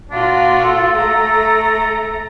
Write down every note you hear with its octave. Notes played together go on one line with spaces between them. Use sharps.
A#2 D4 F4 F#4
A4
A3 A#5